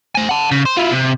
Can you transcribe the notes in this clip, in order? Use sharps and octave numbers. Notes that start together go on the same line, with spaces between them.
C5 G#5
F#5 A5
C#3
C5
E4 F4
C3